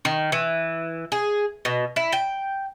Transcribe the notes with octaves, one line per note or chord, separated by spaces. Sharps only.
D#3
E3
G#4
B2
E4
G5